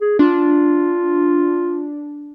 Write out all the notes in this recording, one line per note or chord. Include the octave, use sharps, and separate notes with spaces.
G#4
D4 F4